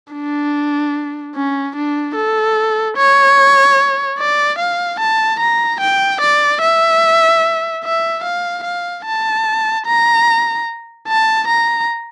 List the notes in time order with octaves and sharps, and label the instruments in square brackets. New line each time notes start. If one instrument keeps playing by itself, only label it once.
[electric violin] D4
C#4
D4
A4
C#5
D5
F5
A5
A#5
G5
D5
E5
E5
F5
F5
A5
A#5
A5
A#5